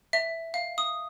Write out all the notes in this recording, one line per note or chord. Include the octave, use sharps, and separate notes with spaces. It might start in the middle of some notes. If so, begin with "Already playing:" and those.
E5
F5
D#6